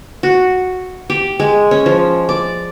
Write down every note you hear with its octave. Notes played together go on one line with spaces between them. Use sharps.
F#4
G4
G#3
C#4
F3
D5